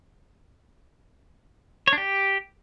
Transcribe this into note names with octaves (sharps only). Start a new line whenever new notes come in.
C#5
D4
G4